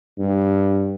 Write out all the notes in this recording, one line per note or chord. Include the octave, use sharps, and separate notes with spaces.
G2